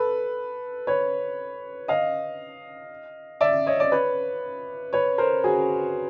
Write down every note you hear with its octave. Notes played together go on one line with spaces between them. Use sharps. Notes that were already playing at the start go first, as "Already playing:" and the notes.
Already playing: A4 B4
B4 C#5
D#5 F5
D5 E5
C#5 D#5
D5
B4 C#5
B4 C#5
A#4 C5
F#4 G#4